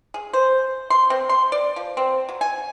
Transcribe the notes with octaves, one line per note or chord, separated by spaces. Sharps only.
G#4
C5
C6
C4
C6
D5
F3
C4
F#3
G#5